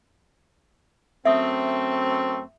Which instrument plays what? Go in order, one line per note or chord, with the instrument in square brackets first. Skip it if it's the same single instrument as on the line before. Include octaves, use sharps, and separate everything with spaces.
[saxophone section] F#2 A3 C4 [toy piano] E5 D#6